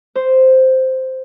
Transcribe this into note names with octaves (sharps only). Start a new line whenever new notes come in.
C5